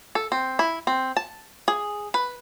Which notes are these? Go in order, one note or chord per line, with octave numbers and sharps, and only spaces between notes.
A4
C4
E4
C4
A5
G#4
B4